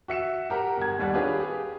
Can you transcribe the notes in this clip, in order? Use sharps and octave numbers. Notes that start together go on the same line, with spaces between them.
F#4 E5 C#7 E7
G4 A#4 F#5 A#5
G1 F#5 G#6
D#2 G3 D5 F#5 F#6
D4 F4 G4 G#4 B4 C#5
G4 G#4